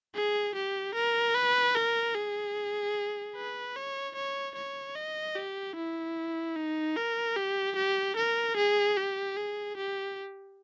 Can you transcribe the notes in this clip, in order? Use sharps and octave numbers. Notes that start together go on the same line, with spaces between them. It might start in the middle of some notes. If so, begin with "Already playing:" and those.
G#4
G4
A#4
B4
A#4
G#4
B4
C#5
C#5
C#5
D#5
G4
E4
D#4
A#4
G4
G4
A#4
G#4
G4
G#4
G4